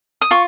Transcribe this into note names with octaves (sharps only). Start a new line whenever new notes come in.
D#6
F4 C#6